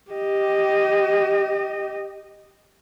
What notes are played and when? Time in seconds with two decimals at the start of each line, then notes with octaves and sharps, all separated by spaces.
0.11 G4 D#5